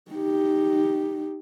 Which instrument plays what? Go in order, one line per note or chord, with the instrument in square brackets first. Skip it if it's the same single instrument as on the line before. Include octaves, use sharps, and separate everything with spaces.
[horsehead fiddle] D#4 G4